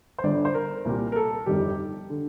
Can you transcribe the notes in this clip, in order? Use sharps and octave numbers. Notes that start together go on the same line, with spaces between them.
C5
G1 G2 D3 D5
C5
A#4
C2 A#2 G3
A#4
A4
G1 F2 D#3 G3 G4
D3